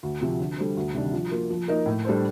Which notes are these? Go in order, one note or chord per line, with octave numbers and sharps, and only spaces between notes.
D2
C3 F3 C4
D3
G3 D4 A4 C5
D2
C3 D#3 G3 D4
F3
A#3 F4
F3
A#3 D#4 A#4
A2
G3 D4 A4 C5